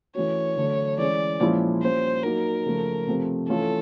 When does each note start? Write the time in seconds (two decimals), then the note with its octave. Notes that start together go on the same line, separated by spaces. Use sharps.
0.15 E3 A3 C#4 F#4 C#5
0.57 D3 F#3 A3
0.98 E3 G#3 C#4 D5
1.40 A#2 F3 G#3 C#4 E4
1.82 G3 A#3 C#4 F4 C5
2.24 F#3 A#3 D#4 F#4 A#4
2.65 C#3 F3 A3
3.07 C3 F3 A3 C4
3.49 E3 A3 C#4 F4 A4